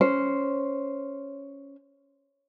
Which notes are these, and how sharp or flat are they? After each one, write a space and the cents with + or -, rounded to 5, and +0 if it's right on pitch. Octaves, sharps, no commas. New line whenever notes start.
C#4 +5 C5 +0